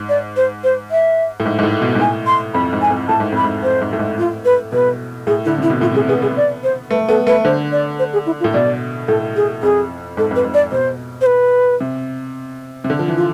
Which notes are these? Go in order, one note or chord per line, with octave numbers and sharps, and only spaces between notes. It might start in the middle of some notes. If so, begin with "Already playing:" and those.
Already playing: G#2
D5
C5
C5
E5
A2
G#2
G#2
A2
B2
G#2
A2 G#5
C6
F2 B5
G#2
G#5
F2
A2 A5
G#2
F2 B5
G#2
F2 C5
G#2
A2
G#2
A2 F4
B4
B2 B4
A2 G#4
D3 E4
C3 E4
B2
A2 F4
C3 G#4
B3 G#4
B3 G#4
D5
C5
A3 B4
B3 A4
A3 B4
D3 C5
D5
C5
G#4
E4
F4
A2
B2 D5
A2 A4
G#4
F2 G#4
G#2 A4
F2 B4
G#2
D5
B2 C5
C5
B4
C3
C3
D3
F3
E3
F4